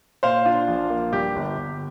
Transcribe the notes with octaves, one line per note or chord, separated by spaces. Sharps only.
A#2 C5 F5
D4 F4
A#1
A#3
G2 G4
G1
G1